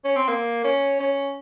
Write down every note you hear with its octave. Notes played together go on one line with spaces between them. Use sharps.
C#4
C4
A#3
C#4
C#4